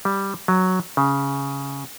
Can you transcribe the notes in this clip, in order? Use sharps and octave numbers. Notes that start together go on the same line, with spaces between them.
G3
F#3
C#3